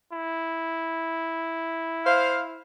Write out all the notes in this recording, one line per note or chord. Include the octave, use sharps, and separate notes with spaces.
E4
C5 F5